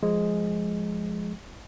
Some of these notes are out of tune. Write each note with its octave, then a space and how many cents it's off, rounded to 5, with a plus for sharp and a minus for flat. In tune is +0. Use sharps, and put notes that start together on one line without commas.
F3 +0 G#3 +0